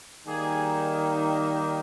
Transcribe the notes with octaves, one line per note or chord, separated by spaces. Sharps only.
D#3 G3 A#3 D#4 G#4